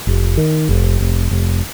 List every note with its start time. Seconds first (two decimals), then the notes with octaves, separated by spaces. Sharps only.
0.07 F1
0.37 D#3
0.69 F1
1.00 F1
1.31 F1